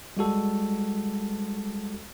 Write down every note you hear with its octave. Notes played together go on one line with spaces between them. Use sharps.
G3 G#3 F#4 A4